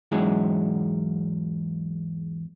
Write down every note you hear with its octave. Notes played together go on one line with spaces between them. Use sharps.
E2 G#2 F#3 G#3 C#4 E4